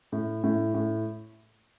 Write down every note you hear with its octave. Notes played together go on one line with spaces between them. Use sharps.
A2
A2
A2